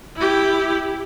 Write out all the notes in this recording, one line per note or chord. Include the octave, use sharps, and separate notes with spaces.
E4 G4